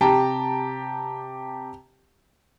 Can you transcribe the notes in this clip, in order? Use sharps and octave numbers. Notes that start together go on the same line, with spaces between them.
C3 G4 G5 A5 A#5